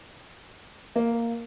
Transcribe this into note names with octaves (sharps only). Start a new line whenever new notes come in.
A#3